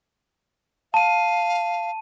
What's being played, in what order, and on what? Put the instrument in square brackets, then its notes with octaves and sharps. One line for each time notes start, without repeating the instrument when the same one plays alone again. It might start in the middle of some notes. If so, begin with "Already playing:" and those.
[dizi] F5 [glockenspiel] A5 D#7